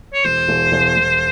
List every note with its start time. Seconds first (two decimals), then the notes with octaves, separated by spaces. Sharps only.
0.14 C#5
0.24 E1 C5
0.48 E1
0.72 E1
0.96 E1